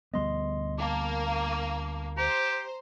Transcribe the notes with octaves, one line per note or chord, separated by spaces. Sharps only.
D2 G3 B3 D#5 C6
A#3 A5 D6
G4 C5 A#5